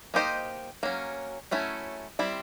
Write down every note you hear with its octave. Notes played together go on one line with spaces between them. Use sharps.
A#3 D#4 G4 C5 D#5
F#3 A#3 C#4
F#3 A3 C#4 E4
G3 C4 E4